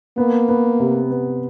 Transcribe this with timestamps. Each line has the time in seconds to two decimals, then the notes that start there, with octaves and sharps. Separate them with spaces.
0.18 A#3 B3
0.49 B3
0.80 C3
1.11 B3